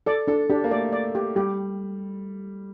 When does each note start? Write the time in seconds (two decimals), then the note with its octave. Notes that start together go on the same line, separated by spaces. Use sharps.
0.06 A4 D5
0.27 D4 A4
0.50 D4 G4
0.64 A#3
0.71 A3 D5
0.93 D5
1.15 G4
1.36 G3 G4